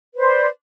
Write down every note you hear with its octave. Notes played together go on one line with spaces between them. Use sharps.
B4 C5 D5